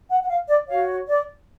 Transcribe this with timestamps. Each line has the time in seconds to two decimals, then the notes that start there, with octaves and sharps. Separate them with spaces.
0.10 F#5
0.22 F#5
0.29 F5
0.49 D5
0.68 F#4 C#5 F5
1.08 D5